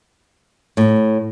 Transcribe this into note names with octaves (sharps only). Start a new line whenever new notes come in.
A2